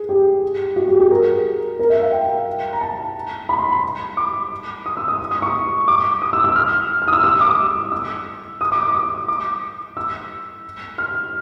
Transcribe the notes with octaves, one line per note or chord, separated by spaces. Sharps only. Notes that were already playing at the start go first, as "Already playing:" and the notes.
Already playing: G#4
G4
F#4
G4
G#4
A#4
A#4
E5
F5
G5
A#5
A5
B5
C6
B5
D6
D#6
E6
D#6
D#6
C#6
D6
D#6
E6
E6
F6
F6
D#6
E6
E6
D6
D#6
E6
D#6
D6
D6
D#6
D6
E6
F6